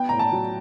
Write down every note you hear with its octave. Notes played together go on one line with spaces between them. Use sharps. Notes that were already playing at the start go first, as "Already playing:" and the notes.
Already playing: B3 G5
A2 A#5
A5
F#3